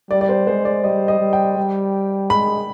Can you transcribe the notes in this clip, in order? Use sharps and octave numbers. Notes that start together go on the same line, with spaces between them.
G3 D5
D5
C5
G#3 C5
D5
G3 D#5
D#5
G3
G5
G3
G#3 B5